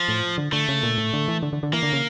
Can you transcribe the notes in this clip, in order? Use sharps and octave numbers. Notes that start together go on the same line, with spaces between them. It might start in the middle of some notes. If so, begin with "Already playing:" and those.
Already playing: F3
A2
D3
D3 A3
C#3
A#2
A2
D3
E3
D3
D3
D3
E3 A#3
D3
C#3